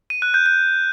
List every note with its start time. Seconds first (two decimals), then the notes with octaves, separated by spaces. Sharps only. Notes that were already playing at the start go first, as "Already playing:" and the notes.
0.10 D#7
0.22 F#6
0.34 G6
0.46 G6